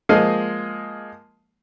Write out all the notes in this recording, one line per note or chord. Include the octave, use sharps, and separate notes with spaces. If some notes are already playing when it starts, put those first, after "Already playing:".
F3 G#3 A#3 D#5 F5